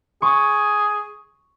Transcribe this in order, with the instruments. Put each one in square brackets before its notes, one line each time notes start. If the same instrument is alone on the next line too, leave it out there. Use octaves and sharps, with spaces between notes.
[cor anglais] G#4 [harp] C#6